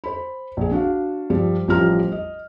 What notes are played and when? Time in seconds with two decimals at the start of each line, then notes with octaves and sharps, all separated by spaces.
0.04 C5 B5
0.57 A#1 G#4
0.71 D4 F#4 F5
1.30 G2 F3 G3
1.68 A1 F3 G3 F4 A#5 F6
2.12 D#5